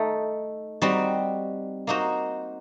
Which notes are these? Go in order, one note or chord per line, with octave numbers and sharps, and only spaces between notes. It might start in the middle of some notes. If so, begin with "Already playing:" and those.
Already playing: A3 D#4 A4
G3 C4 D#4 F#4
A#3 D#4 F#4 C5